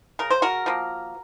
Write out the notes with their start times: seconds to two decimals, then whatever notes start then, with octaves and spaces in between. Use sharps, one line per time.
0.19 C#3 A#4
0.30 C5
0.42 F#4 A#4
0.66 F3 A#3